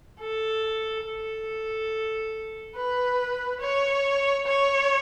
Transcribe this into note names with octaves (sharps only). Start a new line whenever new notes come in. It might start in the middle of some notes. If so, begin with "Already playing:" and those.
A4
A4
B4
C#5
C#5